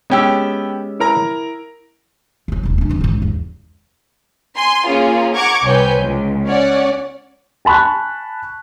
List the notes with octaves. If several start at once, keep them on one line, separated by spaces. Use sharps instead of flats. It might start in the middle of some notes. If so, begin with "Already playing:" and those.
G#3 B3 C#4 G4 G5 E6
E4 A#4 A#5
D3 F#3
D#1 C2
A#3 D4
F1 G3
G#2 C#3
E2
G#5 C6
A#3 C#4 F4 G#4
F#5 A#5 C#6 D6 G#6
C2 C4 B4 C#5 G#5 G6
C#2
C#4 C#5 D5 F#5
G#5 A5 B5 C#6 F#6